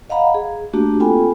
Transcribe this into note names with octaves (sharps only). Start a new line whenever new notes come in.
D#5 F5 F#5 A#5 B5
G#4
A3 A#3 D4 F#4 G4
C4 F4 A4 G5 G#5 B5